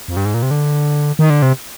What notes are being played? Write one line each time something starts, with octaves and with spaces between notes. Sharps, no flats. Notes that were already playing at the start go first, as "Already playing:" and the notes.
F2
G2
G#2
A#2
C3
D3
D#3
D3
C3